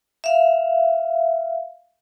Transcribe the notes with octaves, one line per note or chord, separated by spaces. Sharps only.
E5 F5